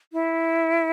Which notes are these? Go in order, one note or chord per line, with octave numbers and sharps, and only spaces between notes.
E4